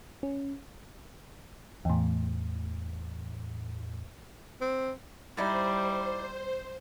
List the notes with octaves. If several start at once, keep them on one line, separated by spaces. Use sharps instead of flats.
C#4
E2 A2
C4
G3 D#4 E4 C5 D5